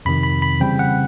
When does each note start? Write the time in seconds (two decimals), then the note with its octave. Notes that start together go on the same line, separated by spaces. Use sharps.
0.05 F2 C3 D#3 B5
0.23 B5
0.42 B5
0.60 C#3 E3 G3 C4 G5
0.79 F#5